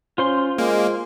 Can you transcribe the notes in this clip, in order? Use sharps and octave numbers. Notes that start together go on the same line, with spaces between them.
C#4 F4 C5 C6
G#3 A#3